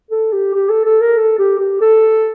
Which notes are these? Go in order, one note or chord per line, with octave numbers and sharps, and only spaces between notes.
A4
G4
G4
A4
A4
A#4
A4
G4
G4
A4